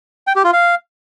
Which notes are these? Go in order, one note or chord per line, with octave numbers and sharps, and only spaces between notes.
G5
G4
F4
F5